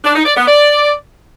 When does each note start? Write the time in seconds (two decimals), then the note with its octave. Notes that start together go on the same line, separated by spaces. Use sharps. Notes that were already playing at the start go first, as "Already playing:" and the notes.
0.04 D4
0.15 D#4
0.25 D5
0.36 B3
0.47 D5